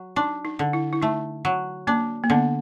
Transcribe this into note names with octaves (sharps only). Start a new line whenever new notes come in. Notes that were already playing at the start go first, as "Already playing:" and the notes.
Already playing: F#3
D4 D#4
D#4
D3
E4
E4
A3 D#4
F#3
A#3 D4
A#3
D3 B3